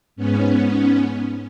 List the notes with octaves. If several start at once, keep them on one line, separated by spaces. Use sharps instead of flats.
G#2 B3 C#4